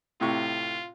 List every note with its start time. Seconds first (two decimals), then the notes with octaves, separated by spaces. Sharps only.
0.21 A2 C3 F4 C#6